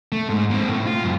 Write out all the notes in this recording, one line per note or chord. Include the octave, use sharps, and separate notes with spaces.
A3
G#2
A#3 C4
A2
F4
C#2 F#2